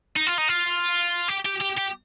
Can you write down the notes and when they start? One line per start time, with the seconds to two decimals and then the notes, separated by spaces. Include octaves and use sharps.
0.16 D#4
0.27 F4
0.38 D#4
0.48 F4
1.28 G4
1.46 G4
1.61 G4
1.78 G4